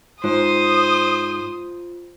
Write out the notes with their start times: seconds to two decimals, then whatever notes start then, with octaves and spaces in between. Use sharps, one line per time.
0.24 G#2 F4 C5 D#6